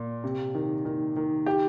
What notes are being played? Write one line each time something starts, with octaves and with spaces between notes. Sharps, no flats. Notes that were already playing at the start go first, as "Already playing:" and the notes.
Already playing: A#2
C3
D#3
D#3
D#3
G4